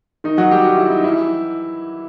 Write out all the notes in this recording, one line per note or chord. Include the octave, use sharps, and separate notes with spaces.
D#3 D#4
F#3 F#4
G3 G4
F#4
E4
D#4
E3 E4